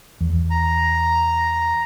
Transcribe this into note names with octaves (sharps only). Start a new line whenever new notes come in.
E2
A#5